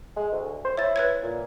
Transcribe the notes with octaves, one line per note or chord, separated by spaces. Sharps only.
G#3
D2
C5
E4 C#5 A6
B4 C#5 G#6
A#2